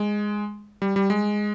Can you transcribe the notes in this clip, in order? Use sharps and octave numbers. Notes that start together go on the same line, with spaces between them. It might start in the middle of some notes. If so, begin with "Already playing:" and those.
Already playing: G#3
G3
G3
G#3